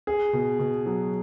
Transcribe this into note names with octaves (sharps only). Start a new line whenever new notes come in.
G#4
B2
B2
F#3